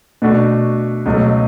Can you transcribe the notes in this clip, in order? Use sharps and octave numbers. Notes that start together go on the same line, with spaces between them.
B2 A3 D4 F#4
C#2 B2 F#3 A3